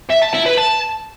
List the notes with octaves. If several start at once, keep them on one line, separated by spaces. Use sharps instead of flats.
E5
A5
E4
B4
A5